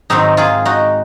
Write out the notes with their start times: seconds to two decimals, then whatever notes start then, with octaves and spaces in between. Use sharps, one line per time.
0.10 G#2 D#3 F#3 C4 D#4
0.37 F4 G#4
0.65 D#4 F#4